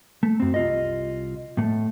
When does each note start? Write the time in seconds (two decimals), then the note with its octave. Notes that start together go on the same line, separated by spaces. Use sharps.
0.23 A3
0.40 F#2 C4
0.54 C2 F4 D#5
1.57 A2 A3